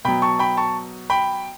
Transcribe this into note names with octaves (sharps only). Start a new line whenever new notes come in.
B2 F#3 G5 B5
A5 C#6
G5 B5
A5 C#6
G5 B5